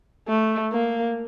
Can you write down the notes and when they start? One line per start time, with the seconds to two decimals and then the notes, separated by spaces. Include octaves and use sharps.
0.28 A3
0.73 A#3